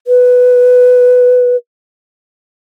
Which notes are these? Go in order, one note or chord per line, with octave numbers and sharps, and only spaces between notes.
B4